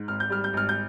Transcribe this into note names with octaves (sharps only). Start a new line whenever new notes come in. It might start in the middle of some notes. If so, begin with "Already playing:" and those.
Already playing: G#2
G#1 F6
G6
G3 F6
G6
G#1 F6
G6